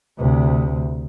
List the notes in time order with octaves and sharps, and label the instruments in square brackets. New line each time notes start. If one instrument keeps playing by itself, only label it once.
[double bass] D2 C3